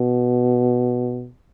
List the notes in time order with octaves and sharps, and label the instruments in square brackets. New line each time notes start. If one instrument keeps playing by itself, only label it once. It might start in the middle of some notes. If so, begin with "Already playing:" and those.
Already playing: [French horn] B2